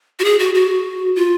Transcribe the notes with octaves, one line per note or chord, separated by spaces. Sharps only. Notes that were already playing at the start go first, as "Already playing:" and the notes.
F#4
G#4
F#4
F#4
F4